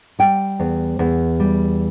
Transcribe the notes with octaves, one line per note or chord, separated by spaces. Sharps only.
G3 G5
E2
E2
G3